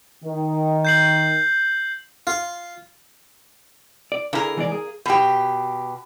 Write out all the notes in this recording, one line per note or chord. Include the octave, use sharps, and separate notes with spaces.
D#3
G6 C7 F#7
F4
D5
D3 A#3 E4 G#4 A#4
E3 G#3 D5
G#4
B2 G4